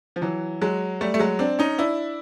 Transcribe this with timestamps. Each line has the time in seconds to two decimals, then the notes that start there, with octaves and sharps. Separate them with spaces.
0.16 F3
0.21 E3 F#3
0.61 F#3 G#3
1.01 G3 A3
1.14 A3
1.19 F#3 G#3
1.39 C4 D4
1.59 C#4 D#4
1.78 D4 E4